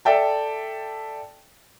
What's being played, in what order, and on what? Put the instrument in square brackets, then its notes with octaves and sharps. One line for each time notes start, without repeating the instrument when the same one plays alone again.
[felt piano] A4 D5 E5 G5 A5